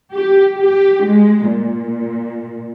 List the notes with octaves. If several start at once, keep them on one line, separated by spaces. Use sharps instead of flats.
G4
G4
G#3
A#2